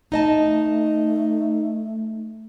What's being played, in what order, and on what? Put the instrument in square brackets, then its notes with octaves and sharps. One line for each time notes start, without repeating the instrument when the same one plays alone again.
[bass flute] A3 [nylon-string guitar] D#4 D#5 A5